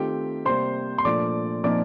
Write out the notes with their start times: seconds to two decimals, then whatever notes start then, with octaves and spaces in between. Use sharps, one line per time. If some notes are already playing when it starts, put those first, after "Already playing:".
Already playing: D#3 A3 C4 F4 G4 G5
0.46 C3 G3 A#3 C5 C6
0.98 C6
1.05 A#2 F3 A3 D4 F4 D5 D6
1.64 A#2 F3 C4 D#4 D5 D6